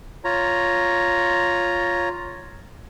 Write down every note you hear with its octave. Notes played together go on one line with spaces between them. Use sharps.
F4 C#5 A#5